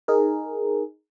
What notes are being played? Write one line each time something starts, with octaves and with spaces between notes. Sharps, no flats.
D#4 G#4 A#4